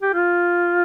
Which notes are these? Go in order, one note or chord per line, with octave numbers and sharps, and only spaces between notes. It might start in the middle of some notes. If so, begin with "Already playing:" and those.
G4
F4